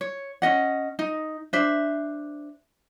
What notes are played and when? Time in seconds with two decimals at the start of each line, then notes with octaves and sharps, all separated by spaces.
0.01 C#5
0.42 C#4 D4 D#5 F#5
0.99 D#4
1.53 D4 C5 E5